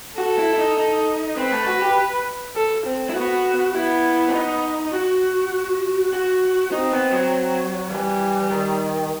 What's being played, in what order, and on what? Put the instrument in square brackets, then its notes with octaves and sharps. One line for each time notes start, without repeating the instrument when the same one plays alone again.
[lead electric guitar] F#4 [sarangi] A4
[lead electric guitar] E4
E4
D#4
D#4
[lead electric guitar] C4 [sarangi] B4
[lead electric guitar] A3
F#4
G4
[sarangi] A4
C4
[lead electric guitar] E4
[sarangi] B3 [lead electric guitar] F#4
[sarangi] B3 [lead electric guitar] E4
[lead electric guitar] C4
D#4
F#4
F#4
[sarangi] C4 [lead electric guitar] D#4
[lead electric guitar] B3
F#3
[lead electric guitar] E3 [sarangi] G3
[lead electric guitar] D#3